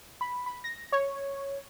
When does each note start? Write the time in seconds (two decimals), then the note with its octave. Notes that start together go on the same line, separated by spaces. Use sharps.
0.21 B5
0.46 B5
0.64 A#6
0.92 C#5